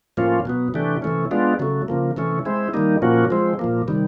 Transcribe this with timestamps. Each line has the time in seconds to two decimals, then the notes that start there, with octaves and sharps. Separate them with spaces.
0.17 A2 F3 A#3 C#4 F4
0.45 B2 F#3 B3
0.74 C3 E3 A3 D4 G4
1.02 C3 E3 A3 C#4
1.31 G#3 B3 D4 F4
1.59 C#3 F#3 A3
1.88 C#3 F3 A#3
2.17 C3 E3 A3 C#4
2.45 G#3 C4 E4
2.74 D#3 G3 A#3 D#4
3.02 A#2 F3 A#3 C#4 F#4
3.30 F3 G#3 C4
3.59 A#2 F3 A#3
3.88 C3 D#3 G3